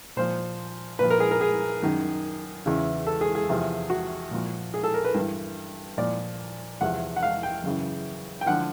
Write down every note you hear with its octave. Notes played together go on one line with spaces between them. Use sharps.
A#2 F3 C5
A#2 F3 B4
A#4
G#4
A#4
G#4
F#2 D#3
E2 C#3 E3
A4
G#4
G#4
E2 C3 F3
F#4
A#2 F3
G#4
A4
A#4
B4
G2 E3
A#2 F3 D5
E2 C3 F3 F#5
F#5
F5
G5
F#2 C#3 E3
G5
D3 F3 F#5